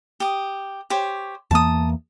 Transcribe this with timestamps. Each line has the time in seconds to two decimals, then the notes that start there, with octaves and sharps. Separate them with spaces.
0.20 G4 D#6
0.90 G4 C5 C#5
1.51 E2 E3 A#3 A5 D#6